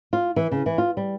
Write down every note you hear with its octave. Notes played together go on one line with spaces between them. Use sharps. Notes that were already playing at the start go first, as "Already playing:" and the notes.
F4
E3
C#3
E3
F4
G3